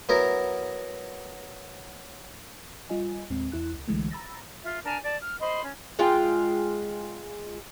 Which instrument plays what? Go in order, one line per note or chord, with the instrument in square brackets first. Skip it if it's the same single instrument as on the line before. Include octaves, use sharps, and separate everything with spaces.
[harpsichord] F#3 B3 E4 A#4 A#5
[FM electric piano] G3 F4 D#5 G#5
D#2 A2 G#3 C4
E2 E4 F#6
C#2
C2 D3 E3 G#3 A3
A#5 B5 E6 A6 A#6
[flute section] F4 E5
D4 A#4 G#5 A5
D5 A5
F6
C5 D#5 B5 C6
C#4
[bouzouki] G#3 F4 G5